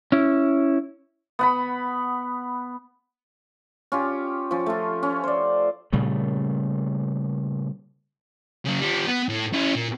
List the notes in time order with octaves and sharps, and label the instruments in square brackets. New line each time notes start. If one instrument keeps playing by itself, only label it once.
[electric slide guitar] C#4 E4
[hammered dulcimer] B3 F#5 B5
C#4 F4 G4
F3 C#4
A3 F4
C#4
C5 D5
[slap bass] A#2 C#3 G3 A3
[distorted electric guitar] C#3 F#3
G3 F4
B3
A2
C#4 E4
A#2